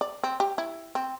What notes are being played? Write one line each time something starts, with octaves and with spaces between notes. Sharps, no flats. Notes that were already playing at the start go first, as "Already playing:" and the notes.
D5
C4
G4
E4
C4